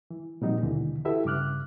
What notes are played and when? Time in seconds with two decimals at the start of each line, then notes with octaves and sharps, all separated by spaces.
0.11 E3
0.42 A#2 F3 G3 C4 D#4 F#4
0.63 D#2 B2 D3 E3
1.05 E4 F#4 G4 A4 B4 E5
1.25 G2 C#3 D6 F6 F#6